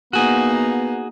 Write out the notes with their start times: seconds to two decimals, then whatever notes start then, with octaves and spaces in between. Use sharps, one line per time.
0.13 A#3 B3 D#4 F#4 G#4